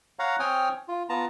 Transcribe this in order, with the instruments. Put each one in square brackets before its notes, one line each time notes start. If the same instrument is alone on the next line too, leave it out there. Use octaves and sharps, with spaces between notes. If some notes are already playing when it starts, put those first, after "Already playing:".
[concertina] C#5 F5 F#5 A#5
C4 C#5 G5 G#5 D#6 F6
F4
B3 F4 A5 A#5